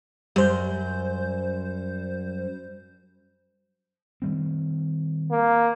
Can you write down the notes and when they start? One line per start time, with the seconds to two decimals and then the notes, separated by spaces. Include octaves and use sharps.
0.36 F#2 G3 C5 G6
4.22 D#3 G3 C4
5.31 A#3